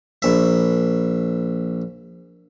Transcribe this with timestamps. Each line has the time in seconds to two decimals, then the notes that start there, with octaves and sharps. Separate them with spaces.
0.22 A#1 E5